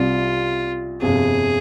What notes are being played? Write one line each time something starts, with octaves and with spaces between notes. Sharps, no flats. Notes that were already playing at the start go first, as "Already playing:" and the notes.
Already playing: C2 C3 G3 F4
G1 F2 C3 G#4